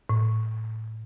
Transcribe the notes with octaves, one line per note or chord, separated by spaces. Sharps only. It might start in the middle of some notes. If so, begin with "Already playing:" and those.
A2